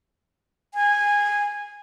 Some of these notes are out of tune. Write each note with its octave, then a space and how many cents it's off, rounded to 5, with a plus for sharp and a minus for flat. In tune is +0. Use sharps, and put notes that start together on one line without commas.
G#5 -15